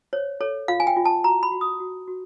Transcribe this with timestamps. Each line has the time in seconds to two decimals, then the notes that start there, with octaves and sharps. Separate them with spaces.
0.13 C5 C#5
0.41 A4 C#5
0.68 F4 F5
0.80 G#5
0.87 G5
0.96 F4
1.05 A5
1.24 F#4 A#5
1.43 B5
1.52 F#4
1.61 D#6
1.80 F#4
2.08 F#4